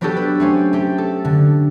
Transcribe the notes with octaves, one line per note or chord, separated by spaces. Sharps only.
F#3 B3 D4 F#4 G4 A4
B4
A3 C4 C#4
A3 G4
A4
D3